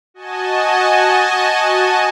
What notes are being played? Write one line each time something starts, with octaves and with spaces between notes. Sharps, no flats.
F#4 D#5 G#5 A5